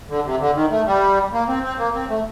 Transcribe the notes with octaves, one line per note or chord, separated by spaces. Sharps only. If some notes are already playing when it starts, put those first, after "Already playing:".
D3
C3
D3
D#3
A3
G3
A#3
C4
C4
A#3
C4
A3